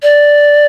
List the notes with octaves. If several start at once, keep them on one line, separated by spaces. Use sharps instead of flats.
D5